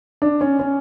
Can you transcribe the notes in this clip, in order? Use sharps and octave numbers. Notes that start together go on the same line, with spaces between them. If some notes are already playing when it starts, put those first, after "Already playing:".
D4
C#4
C#4